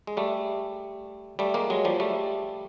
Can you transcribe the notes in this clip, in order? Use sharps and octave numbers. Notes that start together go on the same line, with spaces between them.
G#3
G3 A3
G3 A3
G#3 A#3
F#3 G#3
F3 G3
G3 A3